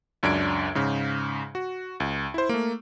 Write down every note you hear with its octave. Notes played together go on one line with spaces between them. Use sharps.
C#2 F#2 D4 G#6 D7
G#2 C#3
F#4
C#2
E4 C5
A3 A#3